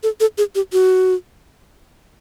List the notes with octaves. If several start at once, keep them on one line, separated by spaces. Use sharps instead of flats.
A4
A4
G#4
G4
F#4